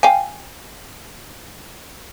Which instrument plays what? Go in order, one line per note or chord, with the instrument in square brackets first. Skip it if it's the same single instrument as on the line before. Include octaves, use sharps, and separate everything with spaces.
[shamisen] F5 G5 G#5